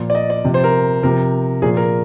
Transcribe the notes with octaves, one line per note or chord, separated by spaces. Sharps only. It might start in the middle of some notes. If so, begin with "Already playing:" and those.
Already playing: A#2 F3
D5
D#5
D5
C3 F3
C5
A#4
C3 F3 A#4
A#2 F3 G#4
A#4